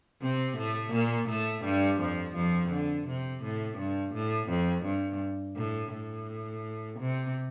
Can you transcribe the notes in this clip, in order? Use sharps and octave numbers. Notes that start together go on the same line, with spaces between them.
C3 C4
A2 A3
A#2 A#3
A2 A3
G2 G3
F2 F3
F2 F3
D3
C3
A2
G2
A2
F2
G2
A2
A2
C3